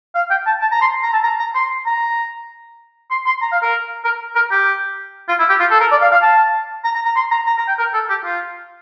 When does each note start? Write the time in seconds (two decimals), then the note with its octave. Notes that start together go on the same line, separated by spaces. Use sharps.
0.15 F5
0.30 G5
0.46 A5
0.62 A5
0.72 A#5
0.82 C6
1.03 A#5
1.13 A5
1.24 A#5
1.40 A#5
1.55 C6
1.86 A#5
3.11 C6
3.26 C6
3.42 A#5
3.52 F5
3.63 A#4
4.05 A#4
4.35 A#4
4.51 G4
5.28 F4
5.39 E4
5.49 G4
5.60 F4
5.71 A4
5.80 A#4
5.91 D5
6.01 F5
6.12 F5
6.22 A5
6.84 A#5
6.95 A#5
7.06 A#5
7.16 C6
7.31 A#5
7.47 A#5
7.58 A#5
7.68 G5
7.79 A#4
7.94 A4
8.09 G4
8.25 F4